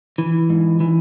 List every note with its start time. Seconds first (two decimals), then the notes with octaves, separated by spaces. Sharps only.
0.18 E3
0.49 G#2
0.80 E3